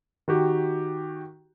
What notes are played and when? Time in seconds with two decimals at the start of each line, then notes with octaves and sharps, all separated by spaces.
0.28 D#3 F#4 G4